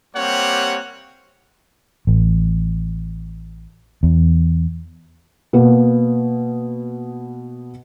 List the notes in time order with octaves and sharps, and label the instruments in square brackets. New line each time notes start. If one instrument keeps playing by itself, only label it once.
[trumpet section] G3 A#3 C4 G4 C#5 F#5
[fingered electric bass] A1
E2
[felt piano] B2 A#3 B3